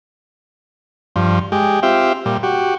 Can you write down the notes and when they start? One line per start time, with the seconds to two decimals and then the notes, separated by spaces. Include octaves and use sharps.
1.16 G2 F3
1.52 G#3 G4
1.83 C4 F4 G4 E5
2.26 A#2 G3
2.43 F#4 G4